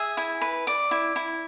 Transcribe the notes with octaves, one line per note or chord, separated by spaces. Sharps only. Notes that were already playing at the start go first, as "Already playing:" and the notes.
Already playing: G#4 E5 G#5
E4
B4
D5
E4
E4